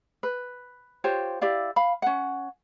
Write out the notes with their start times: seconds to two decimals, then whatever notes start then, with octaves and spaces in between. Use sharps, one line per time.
0.23 B4
1.04 F4 G4 C5 C#5
1.41 E4 G4 D5 F5
1.76 F5 B5
2.02 C#4 F#5